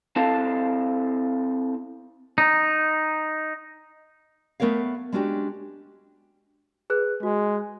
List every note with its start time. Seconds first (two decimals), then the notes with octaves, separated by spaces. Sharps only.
0.16 C4 E4 A4 F5 A5
2.38 D#4
4.60 A3 B3 A#4 C#5 F5
5.12 G#3 C#4 D4 F#4 G4
6.90 G#4 B4 F#6
7.23 G#3 F#4